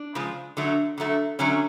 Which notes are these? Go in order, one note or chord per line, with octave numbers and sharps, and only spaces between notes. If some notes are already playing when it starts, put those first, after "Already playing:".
Already playing: D4
C#3 F3 G#3
D3 F#3 A3
D3 F#3 A3
D3 F#3 A3 C#4